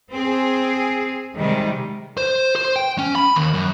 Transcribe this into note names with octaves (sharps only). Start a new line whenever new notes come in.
C4 G#4
C3 D#3 G3 G#3
C5
C5
G5
C#4
B5
D#2
F#2